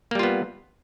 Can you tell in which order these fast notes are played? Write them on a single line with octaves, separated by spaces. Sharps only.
A#3 G3 F4 B3